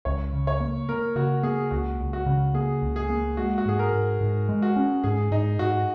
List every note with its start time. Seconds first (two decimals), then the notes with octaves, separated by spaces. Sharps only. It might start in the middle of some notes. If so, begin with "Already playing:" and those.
0.05 C#2 C#5
0.33 C#3
0.47 C#5
0.60 A#3
0.89 A#3 A#4
1.16 C#3 F#4
1.43 A#3 G#4
1.71 C#2 F#4
2.00 C#2
2.13 F#4
2.26 C#3
2.54 A#3 G#4
2.82 C#2
2.96 G#4
3.10 A#3
3.37 G#3 F#4
3.58 F#4
3.66 G#2 G#4
3.79 A#4
3.92 G#2
4.20 G#2
4.49 G#3
4.62 F#4
4.76 C#4
5.04 G#2 G#4
5.31 G#2 D#4
5.59 G#2 F#4